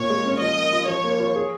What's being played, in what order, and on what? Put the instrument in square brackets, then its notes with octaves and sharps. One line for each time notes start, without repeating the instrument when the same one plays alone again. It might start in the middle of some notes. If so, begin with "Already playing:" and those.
Already playing: [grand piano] A#2 [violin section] C#5
[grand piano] G#3
C#4
[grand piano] F3 [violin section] D#5
[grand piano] A#3
F4
[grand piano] F3 [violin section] C#5
[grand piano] A#3
F4
G#4